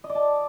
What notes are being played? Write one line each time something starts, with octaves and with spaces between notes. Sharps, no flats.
D#5
D5
A5